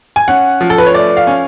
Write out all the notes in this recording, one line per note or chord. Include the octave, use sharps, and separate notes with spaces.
G#5
C#4 F#5
F3
A4
B4
C#5
A3 D5
F5
C#4